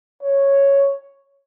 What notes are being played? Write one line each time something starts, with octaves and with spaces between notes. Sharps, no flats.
C#5